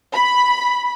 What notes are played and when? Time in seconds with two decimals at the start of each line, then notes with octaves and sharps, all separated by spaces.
0.13 B5